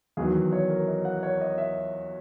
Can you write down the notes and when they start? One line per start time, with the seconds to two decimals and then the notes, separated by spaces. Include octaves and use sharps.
0.17 E2 D#3 F#3 G#4
0.52 C#5
0.70 A#4
0.88 D#5
1.05 F#5
1.23 C#5
1.41 D#5
1.58 E5